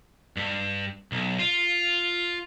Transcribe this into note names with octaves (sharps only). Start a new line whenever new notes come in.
G2
B1
F4